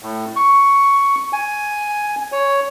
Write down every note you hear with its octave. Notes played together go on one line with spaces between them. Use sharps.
A2
C#6
G#5
C#5